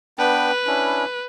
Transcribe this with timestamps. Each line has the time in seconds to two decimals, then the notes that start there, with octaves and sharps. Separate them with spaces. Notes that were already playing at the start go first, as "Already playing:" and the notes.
0.19 B3 D4 B4 G5
0.67 C#4 D4 E4